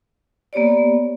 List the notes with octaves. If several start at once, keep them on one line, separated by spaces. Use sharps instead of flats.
A#3 B3 G4 C#5 D5